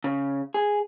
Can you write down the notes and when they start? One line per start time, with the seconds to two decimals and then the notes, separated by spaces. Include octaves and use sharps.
0.04 C#3
0.54 G#4